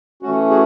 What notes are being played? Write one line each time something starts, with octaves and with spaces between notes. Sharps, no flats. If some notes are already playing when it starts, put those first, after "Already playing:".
E3 A3 C#4 F#4
F#4 G#4